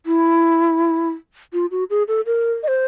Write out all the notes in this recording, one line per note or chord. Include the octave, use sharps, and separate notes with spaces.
E4
F4
F#4
G#4
A4
A#4
D#5
C5